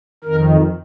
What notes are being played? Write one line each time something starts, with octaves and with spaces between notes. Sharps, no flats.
F2 D#3 A#4